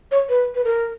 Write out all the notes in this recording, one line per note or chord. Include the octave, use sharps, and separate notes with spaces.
C#5
B4
B4
A#4